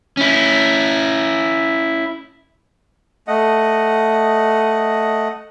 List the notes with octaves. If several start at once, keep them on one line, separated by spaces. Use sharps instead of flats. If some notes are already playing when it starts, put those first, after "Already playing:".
C#4 E4
A3 D#5 F#5